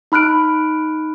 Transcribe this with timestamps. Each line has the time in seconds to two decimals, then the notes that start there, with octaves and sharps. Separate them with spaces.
0.12 D#4 B5 F6 F#6 D7